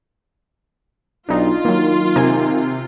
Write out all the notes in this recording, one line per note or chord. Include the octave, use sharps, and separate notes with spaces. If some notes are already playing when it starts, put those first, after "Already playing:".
B1 D4 D#4 F4
D#3 F#3 A#3
C3 A#4 G#5